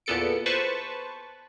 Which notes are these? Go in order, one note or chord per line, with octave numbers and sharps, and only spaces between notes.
E2 A#2 B3 A4 C#7 D7
B4 C5 A5 C#6